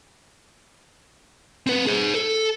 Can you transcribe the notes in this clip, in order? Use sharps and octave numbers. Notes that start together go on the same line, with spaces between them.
C4 B4
G#4 C5
A4